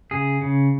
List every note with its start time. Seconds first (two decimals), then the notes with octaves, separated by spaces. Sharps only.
0.11 C#3 G#4
0.41 C#3